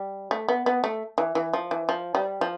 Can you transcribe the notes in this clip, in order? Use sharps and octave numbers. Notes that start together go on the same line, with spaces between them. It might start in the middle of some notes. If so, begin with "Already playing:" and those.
Already playing: G3
A3
B3
B3
A3
E3
E3
F3
E3
F3
G3
F3